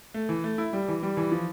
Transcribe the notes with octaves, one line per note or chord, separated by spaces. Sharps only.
A3
E3
A3
E4
G3
E3
G3
E3
F3